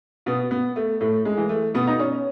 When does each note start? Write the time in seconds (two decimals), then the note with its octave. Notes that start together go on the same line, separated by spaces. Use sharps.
0.26 B2 B3
0.51 B3
0.76 A3
1.01 A2 A3
1.25 G#3
1.37 E3
1.49 A3
1.74 B2 B3
1.87 D#4
1.99 C#4